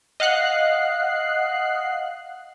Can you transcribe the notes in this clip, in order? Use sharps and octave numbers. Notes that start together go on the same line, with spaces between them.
D#5 F5 F#5 F#6 C7